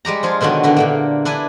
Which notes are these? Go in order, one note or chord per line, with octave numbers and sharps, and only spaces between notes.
G3 G#3 G4 A#5
F3 F4 G#4
B2 D3 D#3 F#3 B3
D3 D#3 E4
A#2 D3 A#3
D4 E4 B4 G#5